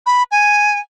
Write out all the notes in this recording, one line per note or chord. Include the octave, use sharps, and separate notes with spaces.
B5
G#5